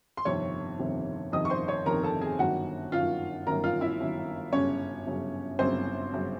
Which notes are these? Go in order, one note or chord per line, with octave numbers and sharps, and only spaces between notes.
C6
G1 F2 C3 D#3 C#5 C#6
G1 F2 C3 D#3
G1 F2 C3 D#3 D#5 D#6
C#6
C5 C6
C#5 C#6
G1 F2 C3 D#3 A#4 A#5
A4 A5
G#4 G#5
G1 F#2 D#3 F#4 F#5
G1 F#2 D#3 F4 F5
G1 F#2 D#3 A#4 A#5
F4 F5
E4 E5
G1 F#2 D#3
G1 F#2 C#3 C#4 C#5
G1 F#2 C#3
G1 F#2 C#3 C4 C5
G1 F#2 C#3